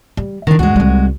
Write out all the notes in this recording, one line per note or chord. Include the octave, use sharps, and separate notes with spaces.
G3
D3 D#3 D4 E4
D2 G2 G#3 F#4
C2 G3